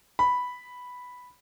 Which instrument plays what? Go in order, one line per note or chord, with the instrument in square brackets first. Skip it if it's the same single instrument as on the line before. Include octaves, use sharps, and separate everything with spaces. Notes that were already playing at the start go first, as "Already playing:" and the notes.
[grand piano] B5